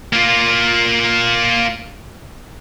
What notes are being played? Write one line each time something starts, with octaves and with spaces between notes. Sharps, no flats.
A#3 F4